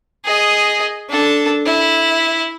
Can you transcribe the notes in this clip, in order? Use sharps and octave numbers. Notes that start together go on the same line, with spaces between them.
G#4 D#5
D4 A4
E4